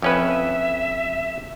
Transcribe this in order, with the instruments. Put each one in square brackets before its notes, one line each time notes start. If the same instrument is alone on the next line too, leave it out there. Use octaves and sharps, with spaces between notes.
[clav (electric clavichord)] F2 C#4 B4 [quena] E5